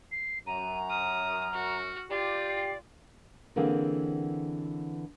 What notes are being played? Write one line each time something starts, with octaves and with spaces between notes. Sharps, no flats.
C7
F#2 A#5 D#7
D#6 F6
F#4
F4 G4 D5
C7
D3 E3 A#3 C4 G#4